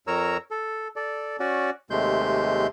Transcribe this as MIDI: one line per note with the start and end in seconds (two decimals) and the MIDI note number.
0.07 0.37 41
0.07 0.37 70
0.07 0.37 73
0.07 0.37 82
0.07 0.37 88
0.51 0.88 69
0.96 1.36 69
0.96 1.36 74
1.40 1.70 61
1.40 1.70 66
1.40 1.70 74
1.90 2.67 39
1.90 2.67 48
1.90 2.67 56
1.90 2.67 57
1.90 2.67 84
1.90 2.67 91